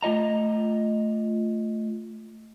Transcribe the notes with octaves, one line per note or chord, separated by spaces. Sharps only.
A3 F4 D#5 A#5